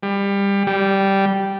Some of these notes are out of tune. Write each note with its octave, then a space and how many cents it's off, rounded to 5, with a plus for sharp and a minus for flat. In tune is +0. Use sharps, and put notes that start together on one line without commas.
G3 +25
G3 -5